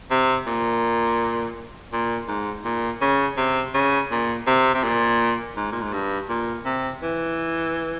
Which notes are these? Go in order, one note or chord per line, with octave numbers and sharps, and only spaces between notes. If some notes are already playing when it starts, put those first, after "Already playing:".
C3
A#2
A#2
G#2
A#2
C#3
C3
C#3
A#2
C3
C3
A#2
G#2
A#2
G#2
G2
A#2
C3
E3